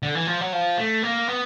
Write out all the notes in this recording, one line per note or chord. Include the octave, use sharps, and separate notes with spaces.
D3
E3
F3
F#3
F3
A3
A#3
B3